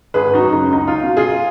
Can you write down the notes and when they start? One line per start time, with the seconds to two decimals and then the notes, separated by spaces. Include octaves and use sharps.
0.14 G#1 G#4 B4
0.34 D#4 F#4
0.44 F#2 C#3
0.53 D#4
0.73 C#2 D#4
0.87 F4
1.03 B2
1.17 F4 G#4